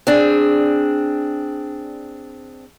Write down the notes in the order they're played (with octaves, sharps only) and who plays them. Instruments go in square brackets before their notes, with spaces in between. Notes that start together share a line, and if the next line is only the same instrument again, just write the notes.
[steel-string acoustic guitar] C4 D4 G#4